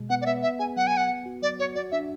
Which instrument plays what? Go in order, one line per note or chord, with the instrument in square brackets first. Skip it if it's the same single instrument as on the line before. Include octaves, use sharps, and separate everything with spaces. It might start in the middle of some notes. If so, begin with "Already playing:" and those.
Already playing: [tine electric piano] B2 G#3
[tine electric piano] B3 [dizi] F#5
[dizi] D5
[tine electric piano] B3 [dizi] E5
[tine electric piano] B3 [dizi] E5
[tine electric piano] G#4 [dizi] G#5
[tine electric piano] F#3 [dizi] F#5
[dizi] G#5
[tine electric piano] B3 [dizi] F#5
[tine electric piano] B3
F#4
[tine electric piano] F#3 [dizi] D5
[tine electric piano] F#4 [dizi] C#5
[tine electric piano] F#4 [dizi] D5
[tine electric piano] D4 [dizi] E5